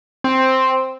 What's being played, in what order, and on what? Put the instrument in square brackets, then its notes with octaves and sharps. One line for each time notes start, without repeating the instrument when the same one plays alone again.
[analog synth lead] C4